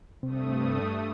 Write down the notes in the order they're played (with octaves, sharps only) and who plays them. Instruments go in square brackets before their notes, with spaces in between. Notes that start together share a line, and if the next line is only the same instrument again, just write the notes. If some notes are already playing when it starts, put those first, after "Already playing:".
[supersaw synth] G2 A3 D#6 [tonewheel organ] C3 C4